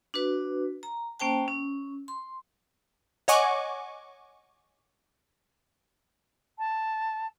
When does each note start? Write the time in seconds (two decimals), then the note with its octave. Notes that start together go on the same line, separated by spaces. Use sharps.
0.14 D4 F#4 B4
0.83 A#5
1.20 A#3 C#4 C5 G5 A5
1.48 C#4
2.08 C6
3.28 C#5 D#5 F#5 G#5 C#6 D6
6.59 A5